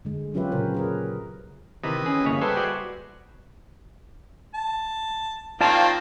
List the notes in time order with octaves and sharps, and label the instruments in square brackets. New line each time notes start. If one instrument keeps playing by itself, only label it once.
[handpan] D3 G#3
F#3 C#4 F4 G4 B4 E5
A#2 C#3 A#4 C5
G#4 A#4 B4
[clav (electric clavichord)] C3 [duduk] D#3 [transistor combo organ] E3 B4 D#5
[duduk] C#4 [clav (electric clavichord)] G#4
[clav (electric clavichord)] G1 C#3 C#5 [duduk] A#3
[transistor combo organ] G3 G#4 C5 [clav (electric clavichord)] G#3 A4 [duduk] B4
[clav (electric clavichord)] F#4 D5 E5
[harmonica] A5
[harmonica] D#3 A#3 C4 [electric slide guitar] F4 D5 A5